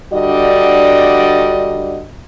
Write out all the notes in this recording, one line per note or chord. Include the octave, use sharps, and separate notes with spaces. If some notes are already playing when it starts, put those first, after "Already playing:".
D3 G3 D4 F#4 D5 D#5